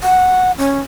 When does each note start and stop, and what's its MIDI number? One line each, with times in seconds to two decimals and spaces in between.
0.03 0.51 78
0.58 0.79 61